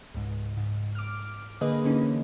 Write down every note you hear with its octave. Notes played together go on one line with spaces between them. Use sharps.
C#2 G#2
G#2
D6 F6
D3 A#3 G#4 B4 D#5
D3 E3 A#3 C#4 D#4